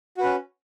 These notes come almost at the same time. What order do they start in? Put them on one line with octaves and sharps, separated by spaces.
F#4 B4 C#4